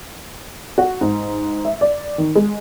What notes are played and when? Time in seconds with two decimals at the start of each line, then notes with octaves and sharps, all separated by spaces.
0.78 F#4
1.01 G#2
1.65 E5
1.81 D5
2.18 D#3
2.35 G#3